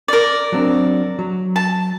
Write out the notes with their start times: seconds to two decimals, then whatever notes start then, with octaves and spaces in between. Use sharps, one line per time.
0.08 A#4 D5
0.52 F#3 C4 D4
1.19 F#3
1.56 A5